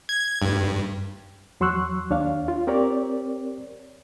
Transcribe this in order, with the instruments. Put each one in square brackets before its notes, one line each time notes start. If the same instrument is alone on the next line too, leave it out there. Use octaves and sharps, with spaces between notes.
[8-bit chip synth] G#6
G2
[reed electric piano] E2 F#3 C6 C#6 E6 F#6
D#2 D4 C#5 F5
F4
C4 G4 A#4 C#5 D5